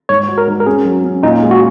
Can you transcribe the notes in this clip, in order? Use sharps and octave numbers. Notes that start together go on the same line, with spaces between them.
G#2 C#5
F#4
A#4
G#2
A#4
C#4 G#4
F#3
C#4
A#2 D#4
G#3
F#4